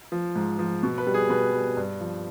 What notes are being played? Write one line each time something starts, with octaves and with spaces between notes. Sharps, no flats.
F3
G#2
F3
B2
B4
G3
G#4
B2 B4
G3
G2
F3